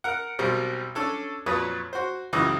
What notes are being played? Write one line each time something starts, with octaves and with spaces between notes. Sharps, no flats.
A#4 F#5
B1 B2 G3 C4 A#4
C#4 D4 A4 C#5
F2 A#2 F#3 B4 C#5 D#6
F#4 C5
C#2 F#2 C#3 E3 D#5 D6